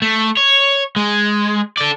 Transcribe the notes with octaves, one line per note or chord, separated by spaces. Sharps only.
A3
C#5
G#3
A4 D5